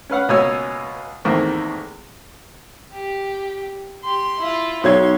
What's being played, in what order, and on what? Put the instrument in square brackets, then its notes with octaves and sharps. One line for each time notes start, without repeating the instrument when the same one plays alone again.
[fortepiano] C#4 B4 F5 F#5
C#2 B2 A#3 C#5 G#5 E6
E2 G#2 D#3 A3 A#3 C4
[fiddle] G4
[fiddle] G4 [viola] C6
[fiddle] E4 F4
[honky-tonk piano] B1 C#5 G#6 [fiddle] C6